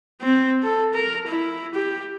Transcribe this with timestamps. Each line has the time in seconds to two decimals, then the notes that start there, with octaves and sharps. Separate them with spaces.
0.22 C4
0.63 A4
0.94 A#4
1.27 E4
1.74 G4